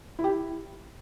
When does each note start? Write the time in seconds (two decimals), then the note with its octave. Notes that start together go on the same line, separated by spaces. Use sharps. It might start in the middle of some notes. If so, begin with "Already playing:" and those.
0.19 E4
0.24 G4
0.29 E4